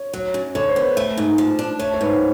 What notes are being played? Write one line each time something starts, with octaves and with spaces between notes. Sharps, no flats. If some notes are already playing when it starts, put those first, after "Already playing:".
Already playing: C#5
F#3
F#2
D3 C#5
C5
B3
B4
A3
G#2
F3
D4
A3 C#5
C#5
G#2 B4
C5